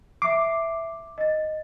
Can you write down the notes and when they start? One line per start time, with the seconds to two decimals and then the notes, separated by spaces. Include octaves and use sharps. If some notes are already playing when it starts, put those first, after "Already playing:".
0.22 E5 D6 C7
1.18 D#5 A6